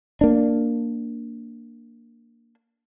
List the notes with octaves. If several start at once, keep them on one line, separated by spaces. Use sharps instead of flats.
A#3 D4